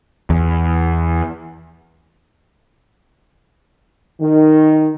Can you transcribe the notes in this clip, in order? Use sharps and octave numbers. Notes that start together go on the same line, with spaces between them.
E2
D#3